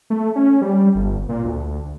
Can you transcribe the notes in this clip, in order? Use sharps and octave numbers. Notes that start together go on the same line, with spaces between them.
A3
C#4
G3
G1
A#2
D2